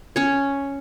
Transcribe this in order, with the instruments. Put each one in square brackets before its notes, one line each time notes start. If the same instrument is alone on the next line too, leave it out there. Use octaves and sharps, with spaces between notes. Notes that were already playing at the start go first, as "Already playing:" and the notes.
[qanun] C#4 C#5